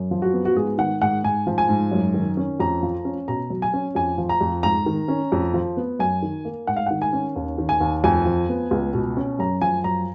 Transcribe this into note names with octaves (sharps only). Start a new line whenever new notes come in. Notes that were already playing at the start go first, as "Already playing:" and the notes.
Already playing: F#2
F3
F#4
B3
F#4
G#2 G#4
D#3 F#5
G#2 F#5
G#2 G#5
F3
G#5
G#2
F#2
D#3
C#4
F2 A#5
F3
C#4
B2 A#5
F#3
G#5
C#4
F2 G#5
F3
A#5
F2
G#2 A#5
D#3
C#4
F2
F3
B3
F#2 G#5
D#3
A#3
G#2 F#5
F5
D#3 F#5
G#5
C#4
D#2
D#3
G#5
D#2
F2 G#5
F3
B3
C#2
B2
C#4
F#2 A#5
F3 G#5
F#2 A#5